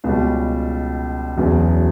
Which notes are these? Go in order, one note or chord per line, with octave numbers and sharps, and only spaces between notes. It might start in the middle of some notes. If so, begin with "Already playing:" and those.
C#2 B2 G3
E1 E2 C#3 F#3